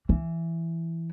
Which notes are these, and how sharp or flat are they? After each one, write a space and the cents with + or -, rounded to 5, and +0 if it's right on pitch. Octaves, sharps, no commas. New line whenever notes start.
E3 +5